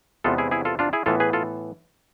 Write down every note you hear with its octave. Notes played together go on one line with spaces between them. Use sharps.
E2 C3 G#3 B3 F4 A4
E4 G#4
E4 G#4
F4 A4
D4 F4
E4 G#4
A2 E3 B3 F4 A4
G#4 B4
F4 A4